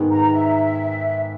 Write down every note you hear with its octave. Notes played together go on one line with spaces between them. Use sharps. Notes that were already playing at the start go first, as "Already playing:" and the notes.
Already playing: G#2 D#3 G#3 B3
A#5
E5